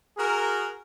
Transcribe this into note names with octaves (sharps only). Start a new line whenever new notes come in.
F#4 G#4 A#4